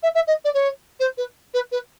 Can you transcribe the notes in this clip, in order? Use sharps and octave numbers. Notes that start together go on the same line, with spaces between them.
E5
E5
D#5
D5
C#5
C5
B4
B4
B4